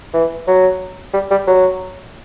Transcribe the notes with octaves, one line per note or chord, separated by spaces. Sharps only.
E3
F#3
G3
G3
F#3